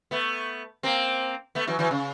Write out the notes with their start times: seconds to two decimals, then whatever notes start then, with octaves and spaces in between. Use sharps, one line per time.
0.11 A3 B3
0.83 A#3 C4
1.55 A3 B3
1.67 E3 F#3
1.79 E3 F#3
1.91 C#3